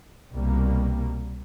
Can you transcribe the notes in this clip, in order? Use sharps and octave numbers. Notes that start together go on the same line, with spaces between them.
C2 B2 G3 A#3